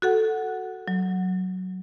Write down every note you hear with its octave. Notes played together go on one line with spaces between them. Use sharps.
F#4 A4 F#5
F#3